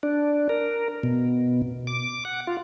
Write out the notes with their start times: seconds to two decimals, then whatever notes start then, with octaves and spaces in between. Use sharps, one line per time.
0.03 D4
0.49 A#4
1.03 B2
1.87 D6
2.25 F#5
2.47 F4